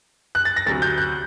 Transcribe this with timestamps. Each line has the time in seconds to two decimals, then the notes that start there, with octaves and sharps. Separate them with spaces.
0.35 F#6
0.45 A6
0.56 A#6
0.66 D2 C3 F#3 A6
0.82 G6
0.98 F#6